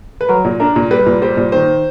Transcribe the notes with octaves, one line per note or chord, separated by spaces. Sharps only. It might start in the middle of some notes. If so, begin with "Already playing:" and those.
B4
F#3 A#4
A#2
D4 A#4
A#2
G3 B4
A#2
G3 C5
A#2
D#3 C5